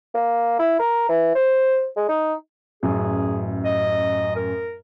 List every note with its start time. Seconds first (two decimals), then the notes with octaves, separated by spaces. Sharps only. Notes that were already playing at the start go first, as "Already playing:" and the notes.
0.15 A#3
0.59 E4
0.80 A#4
1.09 E3
1.35 C5
1.96 G#3
2.09 D#4
2.83 A1 F#2 G#4
3.65 D#5
4.36 A#4